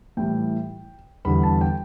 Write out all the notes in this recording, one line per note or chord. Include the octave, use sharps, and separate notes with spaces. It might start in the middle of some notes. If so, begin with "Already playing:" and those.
A2 E3 G3 G5
E2 D3 G3 B3 B5
A5
G5